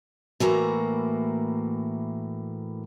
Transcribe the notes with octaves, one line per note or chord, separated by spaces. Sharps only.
A2 E3 A#3 F#4 A#5